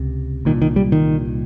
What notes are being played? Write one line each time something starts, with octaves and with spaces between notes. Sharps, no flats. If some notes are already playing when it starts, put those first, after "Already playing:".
Already playing: C#2 C3
C2 A#2 D#3
D#3
G3
D#3